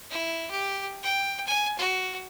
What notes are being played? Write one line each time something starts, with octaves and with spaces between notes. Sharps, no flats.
E4
G4
G5
G#5
F#4